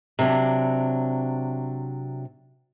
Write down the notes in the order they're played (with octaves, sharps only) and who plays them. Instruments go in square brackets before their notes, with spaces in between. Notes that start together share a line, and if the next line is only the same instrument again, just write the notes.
[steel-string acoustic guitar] C3 F#3 D4